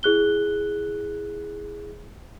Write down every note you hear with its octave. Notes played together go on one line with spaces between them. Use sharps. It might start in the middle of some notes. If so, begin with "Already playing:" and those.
E4 G#4 F#6 G7